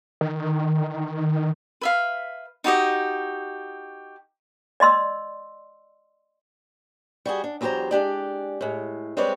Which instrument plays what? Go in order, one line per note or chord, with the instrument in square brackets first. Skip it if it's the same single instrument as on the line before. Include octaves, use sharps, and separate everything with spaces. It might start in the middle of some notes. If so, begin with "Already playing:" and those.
[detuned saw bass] D#3
[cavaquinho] B4 E5 F5
D#4 F#4 G4 D#5
[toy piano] D5 D#5 C6 E6
[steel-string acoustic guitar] G3 F#4 G#4
D4
E2 F#3 E4 G4 C5 A#5
G#3 D4 G4 D5
A2 G#3
G3 G#3 C4 B4 C#5 D5